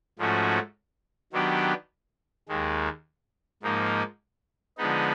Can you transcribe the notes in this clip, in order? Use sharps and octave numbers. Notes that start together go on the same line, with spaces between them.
G#2 F3 A3 C#4 F#4
D#3 F#3 B3 D4 G4
D#2 D#3 G#3
G#2 F3 A#3 D#4
D3 F3 G#3 B3 D#4